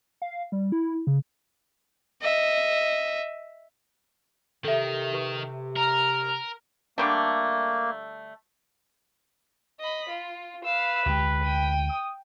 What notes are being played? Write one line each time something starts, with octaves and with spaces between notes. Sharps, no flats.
F5
G3
E4
C#3
D#5 E5
C3 D#3 A4 E5
G4 B4 C#6
A#4 A#5 F6
D3 G3 A3 A#3
D#5 B5
F4
B4 F5 E6
D2 G#3 G4
G5 D#7
D#6